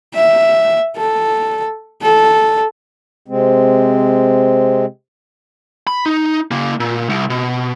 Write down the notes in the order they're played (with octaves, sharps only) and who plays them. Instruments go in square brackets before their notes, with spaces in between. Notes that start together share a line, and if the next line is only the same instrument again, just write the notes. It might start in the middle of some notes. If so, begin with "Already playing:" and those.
[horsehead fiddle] E5
A4
A4
[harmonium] C3 G#3 C4
[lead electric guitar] B5
D#4
C#3 A#3
A#2
C2
B2